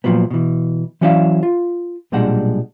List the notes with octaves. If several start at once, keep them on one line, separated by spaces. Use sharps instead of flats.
A#2 D#3 F3 F#3 B3
B2 E3
E3 F#3 C#4 E4 D5 F5
F4
B1 A#2 G3 G#3 D4 F#5